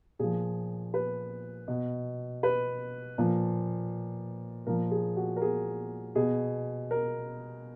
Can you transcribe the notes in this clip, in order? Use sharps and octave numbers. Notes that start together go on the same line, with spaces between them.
A#2 F3 G#4
B4
B2
B4
A#2 F3
A#2 F3 A#4
G#4
F#4
A#4
G#4
B2 G#4
A#4